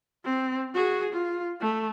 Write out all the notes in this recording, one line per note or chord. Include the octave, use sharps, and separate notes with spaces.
C4
F#4 G#4
F4
A3